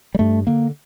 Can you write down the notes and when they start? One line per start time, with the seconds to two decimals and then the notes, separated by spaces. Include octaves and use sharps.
0.15 G3
0.19 G2 A3
0.47 D3 A#3